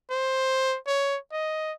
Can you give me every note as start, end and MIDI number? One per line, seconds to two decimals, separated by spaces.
0.10 0.77 72
0.87 1.18 73
1.32 1.73 75